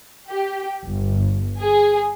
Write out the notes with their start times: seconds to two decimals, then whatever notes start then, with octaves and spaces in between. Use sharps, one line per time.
0.29 G4
0.85 G1
1.59 G#4